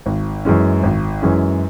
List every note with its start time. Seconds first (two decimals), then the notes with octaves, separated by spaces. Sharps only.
0.06 G#1
0.45 F#2 E3 G#3 C#4
0.83 G#1
1.22 F#2 E3 G#3 C#4